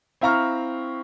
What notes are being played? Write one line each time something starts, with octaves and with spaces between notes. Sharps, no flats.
C4 E4 F5 A#5 C#6 F6